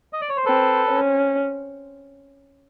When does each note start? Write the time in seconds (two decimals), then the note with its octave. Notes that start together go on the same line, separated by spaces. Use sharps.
0.13 D#5
0.21 D5
0.29 C#5
0.37 C5
0.45 C4 A4 B4
0.91 C#4